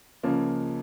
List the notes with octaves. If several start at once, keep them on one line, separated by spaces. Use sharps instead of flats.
C#2 C#3 F3 A#3 C#4